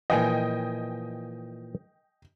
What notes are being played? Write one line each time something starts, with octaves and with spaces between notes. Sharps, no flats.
A#2 E3 F3 D#5 G5 G#5